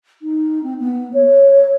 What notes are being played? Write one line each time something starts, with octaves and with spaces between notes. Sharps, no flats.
D#4
C4
B3
C#5